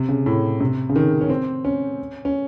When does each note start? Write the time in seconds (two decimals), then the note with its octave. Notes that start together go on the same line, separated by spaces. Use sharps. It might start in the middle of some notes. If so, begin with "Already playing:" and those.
Already playing: C3
0.09 C#3
0.26 A2
0.60 C3
0.89 C#3
0.96 D#3
1.21 C#4
1.30 C4
1.65 C#4
2.25 C#4